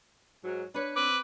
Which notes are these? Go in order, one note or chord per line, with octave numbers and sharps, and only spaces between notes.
G#2 F#3
D4 B4 C#5
C4 B4 D6